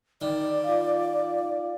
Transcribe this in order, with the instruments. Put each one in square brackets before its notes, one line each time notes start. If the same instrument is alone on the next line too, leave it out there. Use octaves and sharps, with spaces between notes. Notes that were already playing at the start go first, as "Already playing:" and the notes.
[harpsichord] D#3 [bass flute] D5
[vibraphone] F4 F5